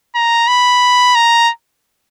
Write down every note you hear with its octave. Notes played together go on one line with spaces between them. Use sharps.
A#5
B5
A#5